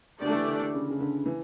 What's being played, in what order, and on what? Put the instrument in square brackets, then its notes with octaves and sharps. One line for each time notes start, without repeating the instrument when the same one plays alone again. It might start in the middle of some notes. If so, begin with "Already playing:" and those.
[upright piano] D3 [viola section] A3 D4 G4 D5
[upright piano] E3
D3
D3
C#3
C#3
D3
E3